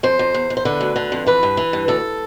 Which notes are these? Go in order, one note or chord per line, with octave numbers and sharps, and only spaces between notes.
F2 C5
F2
E2
E2
C5
D3 B4
D2
D3
F2
E3 B4
G2
E3
G2
D2 A4